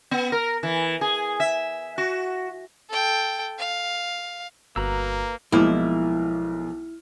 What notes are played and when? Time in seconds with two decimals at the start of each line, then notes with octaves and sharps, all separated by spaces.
0.11 B3
0.32 A#4
0.63 E3
1.01 G#4
1.40 E5
1.98 F#4
2.90 A4 G5
3.58 F5
4.76 G1 A#3 F#4 B4 A#5 E6
5.52 B1 F3 G#3 A#3 E4 D#5 F6